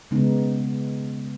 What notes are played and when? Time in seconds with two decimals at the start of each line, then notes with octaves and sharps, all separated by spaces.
0.11 C#3 G#3 B3 D#4